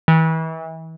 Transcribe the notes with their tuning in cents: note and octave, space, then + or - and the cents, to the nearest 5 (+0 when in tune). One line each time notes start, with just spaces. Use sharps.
E3 -35